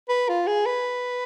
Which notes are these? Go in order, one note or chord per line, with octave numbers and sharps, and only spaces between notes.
B4
F4
G#4
B4